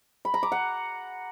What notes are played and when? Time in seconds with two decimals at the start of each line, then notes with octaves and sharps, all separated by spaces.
0.25 B5
0.34 A#5
0.43 D6
0.52 F#5